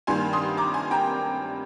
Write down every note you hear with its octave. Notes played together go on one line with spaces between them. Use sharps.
G2 D#3 A#3 G#5 C6
C6 D#6
A#5 D6
G#5 C6
G5 A#5